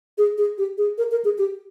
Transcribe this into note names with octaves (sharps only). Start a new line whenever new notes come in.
G#4
G#4
G4
G#4
A#4
A#4
G#4
G4